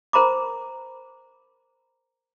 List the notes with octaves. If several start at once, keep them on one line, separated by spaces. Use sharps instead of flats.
A#4 C5 A#5 B5 D6